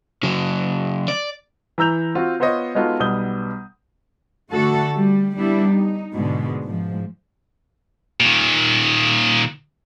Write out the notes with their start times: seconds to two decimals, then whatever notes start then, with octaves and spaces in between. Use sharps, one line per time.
0.23 C#3 F#3
1.08 D5
1.78 E3 A#5 E6 G6 F7
2.15 C4 F4 F#4
2.40 B3 F4 C5 C#5 D#5
2.75 G#3 B3 D#4 F4 F#4 A4
3.00 B1 G3 B3 D#6 G6 G7
4.51 D3 A3 F#4 A4
4.96 G3
5.36 G3 B3 D4 E4
5.68 D#4
6.12 G#2 B2 D3 G#3
6.64 G#2 F3
8.20 A#2 D#3